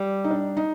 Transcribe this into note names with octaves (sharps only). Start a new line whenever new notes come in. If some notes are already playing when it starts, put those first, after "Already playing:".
Already playing: G3
D#4
D4
D#4